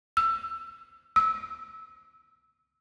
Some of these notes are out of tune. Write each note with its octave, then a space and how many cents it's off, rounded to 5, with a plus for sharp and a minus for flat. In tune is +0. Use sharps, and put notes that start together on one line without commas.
E6 +15
E6 -20